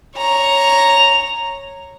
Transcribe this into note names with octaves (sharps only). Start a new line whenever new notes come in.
C#5 A#5